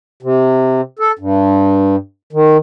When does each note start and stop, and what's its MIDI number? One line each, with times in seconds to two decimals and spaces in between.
0.23 0.81 48
0.99 1.12 69
1.19 1.96 43
2.33 2.57 51